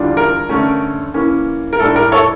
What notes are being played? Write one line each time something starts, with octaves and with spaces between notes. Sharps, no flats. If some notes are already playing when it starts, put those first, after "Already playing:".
Already playing: E2 D3 G3 D4 F4
A#4
G2 D3 A3 C#4
E3 A#3 C#4
A#4
A2 G3 D4 A4
A#4
A4 C#5